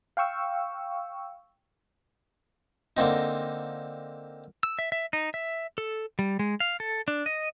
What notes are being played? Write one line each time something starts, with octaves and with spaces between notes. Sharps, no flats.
F5 G5 C#6 E6
D3 A#3 C4 D#4
E6
E5
E5
D#4
E5
A4
G3
G#3
F5
A4
D4
D#5